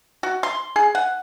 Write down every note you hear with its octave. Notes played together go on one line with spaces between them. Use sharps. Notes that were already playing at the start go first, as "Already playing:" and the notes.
F#4
C6
G#4
F#5